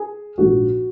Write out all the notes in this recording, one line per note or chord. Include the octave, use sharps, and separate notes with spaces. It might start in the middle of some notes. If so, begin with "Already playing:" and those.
Already playing: G#4
A#1 G#2 F3 F#4